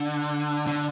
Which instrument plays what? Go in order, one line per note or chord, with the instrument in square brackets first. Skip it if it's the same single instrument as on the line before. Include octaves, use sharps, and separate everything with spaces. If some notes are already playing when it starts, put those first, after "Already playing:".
Already playing: [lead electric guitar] D3
D3